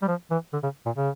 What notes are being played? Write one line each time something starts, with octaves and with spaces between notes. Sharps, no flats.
G3
F3
E3
D3
C#3
A#2
C#3